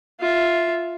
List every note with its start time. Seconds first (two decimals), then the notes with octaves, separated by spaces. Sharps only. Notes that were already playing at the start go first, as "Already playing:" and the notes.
0.20 F4 E5